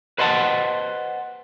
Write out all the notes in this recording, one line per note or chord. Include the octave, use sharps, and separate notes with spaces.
B4 C5 D#5 F#5 A5